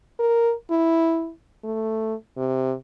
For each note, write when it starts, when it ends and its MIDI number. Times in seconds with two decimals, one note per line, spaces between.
0.19 0.53 70
0.70 1.31 64
1.64 2.14 57
2.37 2.74 48